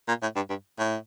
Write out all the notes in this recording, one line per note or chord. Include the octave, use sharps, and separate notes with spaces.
A#2
A2
G2
G2
A2